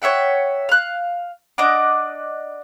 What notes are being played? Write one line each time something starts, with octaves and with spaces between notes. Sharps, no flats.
C#5 E5 F#5 G5
F5 F#6
D4 D#5 F#5 D6